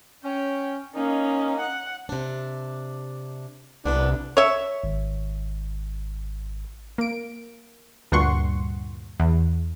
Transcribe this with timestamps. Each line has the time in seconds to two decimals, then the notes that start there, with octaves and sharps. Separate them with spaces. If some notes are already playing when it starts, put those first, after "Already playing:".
0.25 C#4 G5
0.95 A#3 C#4 D#4 D#5
1.59 F#5
2.09 C3 D4
3.85 C2 B3 D4 A4 B4
4.37 C#5 E5
4.84 G#1
6.98 A#3 D7
8.12 D2 G2 A#2 F#5 C6 C#6
9.20 E2